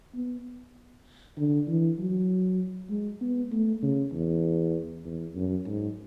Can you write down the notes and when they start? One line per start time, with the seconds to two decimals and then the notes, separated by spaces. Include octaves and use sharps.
0.15 B3
1.38 D3
1.68 E3
1.99 F#3
2.90 G#3
3.21 B3
3.52 A3
3.83 C#3
4.13 E2
5.05 E2
5.35 F#2
5.66 G#2